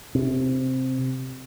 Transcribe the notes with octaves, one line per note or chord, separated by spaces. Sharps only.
C3